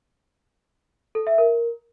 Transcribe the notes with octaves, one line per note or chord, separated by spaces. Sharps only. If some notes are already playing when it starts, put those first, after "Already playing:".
A4
E5
A#4